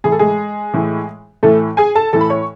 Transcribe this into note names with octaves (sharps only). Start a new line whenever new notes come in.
A2 E3 G#4
A4
G#3 G#4
A2 E3
A2 E3 A3 A4
G#4 G#5
A4 A5
A2 E3 A4 A5
B5
C#5 C#6